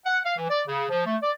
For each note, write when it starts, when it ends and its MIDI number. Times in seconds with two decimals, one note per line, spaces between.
0.06 0.19 78
0.25 0.37 77
0.38 0.47 52
0.50 0.62 74
0.68 0.85 49
0.90 1.05 53
1.07 1.16 57
1.23 1.31 74